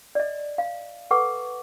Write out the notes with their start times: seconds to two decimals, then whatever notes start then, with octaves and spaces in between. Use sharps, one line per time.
0.15 D5 D#5
0.58 F5
1.11 A4 B4 F#5 C#6 D6